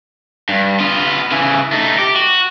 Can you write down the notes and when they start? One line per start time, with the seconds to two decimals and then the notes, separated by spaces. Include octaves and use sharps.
0.49 G2
0.80 B3 F4
1.31 C#3 E3
1.72 A3 D#4
1.99 G4
2.16 F#4